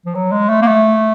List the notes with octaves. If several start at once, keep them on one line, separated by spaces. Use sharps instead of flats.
F3
F#3
G#3
A3
A#3
A3